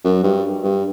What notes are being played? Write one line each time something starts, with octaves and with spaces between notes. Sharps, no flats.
F#2
G2
G2